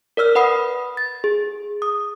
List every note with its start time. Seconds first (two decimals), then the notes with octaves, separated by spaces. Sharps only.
0.17 A#4 D5 E6 F6
0.35 B4 F#5 B5 D#6 C7
0.97 A6
1.24 G#4
1.82 D#6